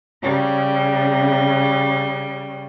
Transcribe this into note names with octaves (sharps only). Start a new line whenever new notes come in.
C#3 G3